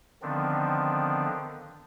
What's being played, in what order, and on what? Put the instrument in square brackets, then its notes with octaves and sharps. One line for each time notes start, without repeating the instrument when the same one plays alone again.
[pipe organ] D3 D#3 F3 B3 C4 D4